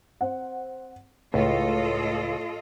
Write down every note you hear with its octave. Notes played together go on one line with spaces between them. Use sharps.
C4 F#5
C#2 A2 F4 A4 D#5